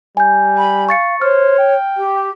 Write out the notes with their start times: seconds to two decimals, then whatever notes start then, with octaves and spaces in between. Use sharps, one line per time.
0.17 G3 G#5 G6
0.57 B5
0.89 F5 C#6 A6 C#7
1.21 C5 C#5 F6
1.58 G5
1.96 G4